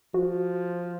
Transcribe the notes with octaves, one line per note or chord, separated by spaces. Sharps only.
F3 F#4